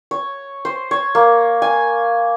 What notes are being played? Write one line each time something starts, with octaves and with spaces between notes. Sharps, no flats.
C#5
C5
C#5
A#3
G#5